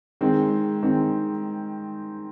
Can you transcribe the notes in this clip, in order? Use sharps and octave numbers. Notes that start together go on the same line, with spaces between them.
D#3 G#3 C4
D#3 G#3 C4